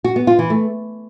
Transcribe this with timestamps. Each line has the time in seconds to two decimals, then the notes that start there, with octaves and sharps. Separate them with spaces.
0.04 F#4
0.16 B3
0.27 F4
0.39 E3
0.50 A3